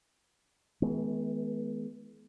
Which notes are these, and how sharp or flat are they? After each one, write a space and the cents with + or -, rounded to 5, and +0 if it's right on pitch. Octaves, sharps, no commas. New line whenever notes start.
E3 -40 G#3 +40 B3 +0